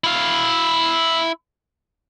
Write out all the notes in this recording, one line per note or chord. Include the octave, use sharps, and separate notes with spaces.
E4 F5